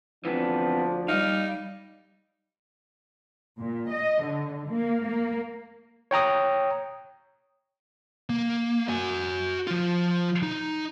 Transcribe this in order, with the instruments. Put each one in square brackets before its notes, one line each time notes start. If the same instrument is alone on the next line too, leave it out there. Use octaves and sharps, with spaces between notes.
[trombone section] D2 F3 D4 [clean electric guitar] E3 B3 C4
[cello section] G3 [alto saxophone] D#4 [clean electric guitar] F5
[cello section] A#2
D#5
D3
A#3
A#3
[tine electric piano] C#5 G5 A#5 D#6
[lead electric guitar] A#3
F#4 G#5
F3 F4
D#4